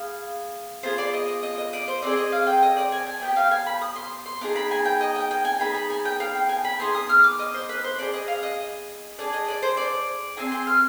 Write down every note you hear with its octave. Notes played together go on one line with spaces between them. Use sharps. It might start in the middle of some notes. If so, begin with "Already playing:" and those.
Already playing: B3 G#4 F5
B3 F4 G#4 C5
D5
D#5
D#5
D#5
D#5
D5
C5
C4 D#4 G#4 D5
D#5
F5
G5
D#5
D5
G#5
G#5
B3 D#4 G4 G5
F5
G#5
B5
D#6
C6
C6
B3 D#4 G#4 D6
B5
G#5
G5
D#5
G5
G5
G#5
B3 D#4 G#4 B5
B5
G#5
G5
F5
G5
G#5
B5
B3 D#4 G#4 C6
D#6
F6
D6
D#5
C5
B4
C5
B3 D4 G#4 D5
D#5
F5
D#5
D4 G#4 D5
D#5
D5
C5
D5
C4 D#4 G#4 G#5
C6
F6